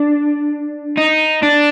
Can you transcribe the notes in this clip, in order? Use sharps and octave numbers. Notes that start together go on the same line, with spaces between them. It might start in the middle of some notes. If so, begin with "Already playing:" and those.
Already playing: D4
D#4
D4